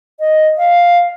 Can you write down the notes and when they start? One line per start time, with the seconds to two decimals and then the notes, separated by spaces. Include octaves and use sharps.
0.20 D#5
0.57 F5